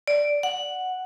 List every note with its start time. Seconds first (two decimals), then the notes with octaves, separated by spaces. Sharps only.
0.08 D5
0.43 F#5